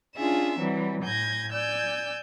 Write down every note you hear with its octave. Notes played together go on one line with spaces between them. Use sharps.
C#4 D4 F4 G#4 E5
E3 F#3 G3 C4
A2 G#5 G6 G#6 A#6
D5 G#5 E6 G6